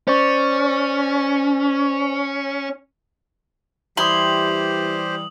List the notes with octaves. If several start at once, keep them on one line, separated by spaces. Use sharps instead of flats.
C#4 C5 D5 C#6
E3 G3 E4 G4 C5 C6 D#6 F#7